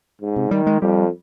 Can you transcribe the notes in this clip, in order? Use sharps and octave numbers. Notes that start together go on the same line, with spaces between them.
G#2
C3
D#3 G3
G#3
F2 G3